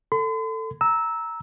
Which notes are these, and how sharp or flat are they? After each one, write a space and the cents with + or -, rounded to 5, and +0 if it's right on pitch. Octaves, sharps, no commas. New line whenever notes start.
A4 +15 C6 -45
A#5 +0 E6 -15